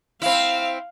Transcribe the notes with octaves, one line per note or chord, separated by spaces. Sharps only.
C4 E4 F5